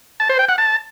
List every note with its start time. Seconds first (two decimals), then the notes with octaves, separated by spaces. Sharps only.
0.20 A5
0.29 C5
0.39 G5
0.49 F#5
0.58 A5